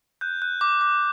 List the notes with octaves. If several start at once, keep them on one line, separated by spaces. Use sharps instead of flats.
F#6 G6
F#6
D6
D6